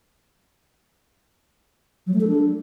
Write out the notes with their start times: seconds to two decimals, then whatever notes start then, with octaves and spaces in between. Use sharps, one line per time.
2.07 F#3
2.14 A3
2.21 A4
2.28 D4